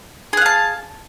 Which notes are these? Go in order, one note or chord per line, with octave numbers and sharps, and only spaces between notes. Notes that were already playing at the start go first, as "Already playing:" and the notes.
G#4 F5 F#5 A5